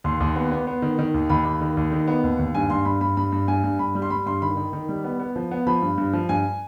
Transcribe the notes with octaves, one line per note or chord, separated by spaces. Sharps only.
D#2 C6
D#2
B3
B3
B3
D#3
D#3
D#2
D#2 B5
D#2
D#3
D#2
D#3
B3
D#2
D#2
G2 G#5
G2 C6
G2 B5
G2 B5
G2 B5
G2
G2 G#5
G2
G2 B5
G3
C6
G3 B5
G2 C6
D#3 B5
D#3
D#3
G3
B3
B3
F3
B3
F3 B5
G2
G2
F3
G2 G#5